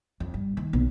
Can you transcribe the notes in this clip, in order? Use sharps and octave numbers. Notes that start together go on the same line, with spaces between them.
F2
G2
D#3
B1